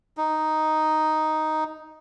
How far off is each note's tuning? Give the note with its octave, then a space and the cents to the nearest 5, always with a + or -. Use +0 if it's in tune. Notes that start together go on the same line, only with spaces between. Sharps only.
D#4 +0